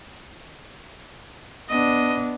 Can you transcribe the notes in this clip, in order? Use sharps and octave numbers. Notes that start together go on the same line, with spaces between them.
B3 D4 D#5